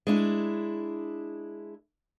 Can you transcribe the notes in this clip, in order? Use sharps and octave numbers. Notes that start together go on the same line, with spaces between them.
G#3 D4 E4